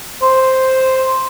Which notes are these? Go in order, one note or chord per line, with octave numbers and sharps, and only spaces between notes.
C5